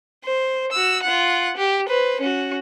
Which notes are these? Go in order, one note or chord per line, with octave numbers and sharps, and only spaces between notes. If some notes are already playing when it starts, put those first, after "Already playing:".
C5
F#4 E6
F4 F#5
G4
B4 C5
C#4 F#4